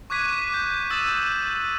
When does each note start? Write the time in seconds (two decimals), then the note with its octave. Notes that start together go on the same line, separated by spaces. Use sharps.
0.10 C#6 D6 F#6 G#6 B6 D#7
0.49 D6 G6
0.90 D#6 E6 A6 D#7 E7 F#7